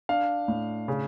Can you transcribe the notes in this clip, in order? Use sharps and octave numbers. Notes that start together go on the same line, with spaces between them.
D4 F5
A2
C#3